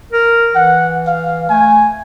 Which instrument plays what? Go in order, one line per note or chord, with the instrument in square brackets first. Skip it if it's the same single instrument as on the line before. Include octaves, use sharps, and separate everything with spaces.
[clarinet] A#4
[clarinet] E3 [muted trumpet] F#5
[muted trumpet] F5
[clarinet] A3 [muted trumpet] G#5